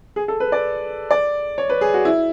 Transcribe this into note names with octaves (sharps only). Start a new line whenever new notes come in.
G#4
A4
B4
D5
D5
C#5
B4
G#4
F#4
E4